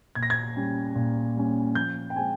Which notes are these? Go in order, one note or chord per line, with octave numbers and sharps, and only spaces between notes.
A#2 G#6
A#6
G#6
G3 C#4
A#2
G3 C#4
F3 G6
G5
G#3 C4 G#5